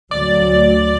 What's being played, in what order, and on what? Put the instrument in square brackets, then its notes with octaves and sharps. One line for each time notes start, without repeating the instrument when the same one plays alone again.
[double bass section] D2 F#3 [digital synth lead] D5